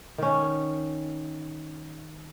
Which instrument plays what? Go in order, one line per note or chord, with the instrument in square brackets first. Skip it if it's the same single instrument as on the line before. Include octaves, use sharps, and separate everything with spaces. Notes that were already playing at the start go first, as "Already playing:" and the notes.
[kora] D#3 C#4